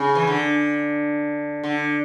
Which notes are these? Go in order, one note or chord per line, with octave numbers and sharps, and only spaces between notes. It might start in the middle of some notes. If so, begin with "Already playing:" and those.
Already playing: C#3
E3
D3
D3